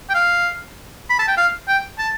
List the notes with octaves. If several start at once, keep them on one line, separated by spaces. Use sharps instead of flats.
G5
F5
B5
A5
G5
F5
G5
A5